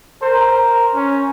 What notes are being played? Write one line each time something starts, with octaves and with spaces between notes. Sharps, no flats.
A#4 C5
C#4